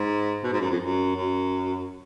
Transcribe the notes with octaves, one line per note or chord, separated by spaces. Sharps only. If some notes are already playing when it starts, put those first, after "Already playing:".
Already playing: G#2
B2
G#2
F#2
F2
F#2
F#2